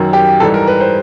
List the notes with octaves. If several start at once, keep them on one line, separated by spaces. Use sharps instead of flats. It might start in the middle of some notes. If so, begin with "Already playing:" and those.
Already playing: F#2 D#3 F#3
G4
G#2 E3 G3 A4
A#4
B4
C5